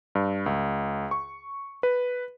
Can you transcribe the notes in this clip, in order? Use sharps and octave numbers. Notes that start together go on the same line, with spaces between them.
G2
C#2
C#6
B4